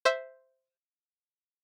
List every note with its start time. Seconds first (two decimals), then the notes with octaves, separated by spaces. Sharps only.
0.05 C5 E5